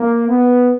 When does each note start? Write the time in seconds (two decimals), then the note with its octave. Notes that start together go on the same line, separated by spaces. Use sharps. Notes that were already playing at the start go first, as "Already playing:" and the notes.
Already playing: A#3
0.28 B3